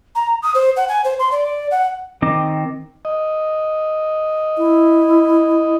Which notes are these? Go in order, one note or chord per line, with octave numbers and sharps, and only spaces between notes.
A#5
D#6
C5
F#5
G#5
C5
C6
D5
F#5
D#3 C4 D#5 D6
D#5
E4